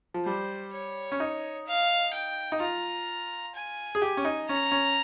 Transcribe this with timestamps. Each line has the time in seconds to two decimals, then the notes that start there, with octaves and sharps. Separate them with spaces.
0.14 F3
0.25 G3 C5
0.73 C#5
1.12 C#4
1.20 D#4
1.67 F5
2.13 G5
2.52 D#4
2.60 F4 A#5
3.55 G#5
3.95 G#4
4.02 G4
4.17 C#4
4.25 D#4
4.48 C#4 A#5
4.72 C#4